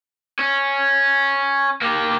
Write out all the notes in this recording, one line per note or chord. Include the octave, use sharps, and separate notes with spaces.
C#4
A#3 G4